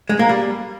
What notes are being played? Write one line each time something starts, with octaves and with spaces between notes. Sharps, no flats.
G#3
A#3
G3